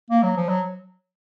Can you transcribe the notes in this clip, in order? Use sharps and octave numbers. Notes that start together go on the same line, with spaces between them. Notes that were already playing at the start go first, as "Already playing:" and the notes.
A#3
F#3
F3
F#3